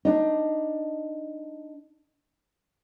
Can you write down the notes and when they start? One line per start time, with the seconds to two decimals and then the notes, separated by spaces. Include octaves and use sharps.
0.05 D4 D#4